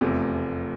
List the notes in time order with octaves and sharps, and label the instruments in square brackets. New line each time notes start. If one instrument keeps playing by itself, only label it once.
[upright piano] F1 E2 C3 F3 A3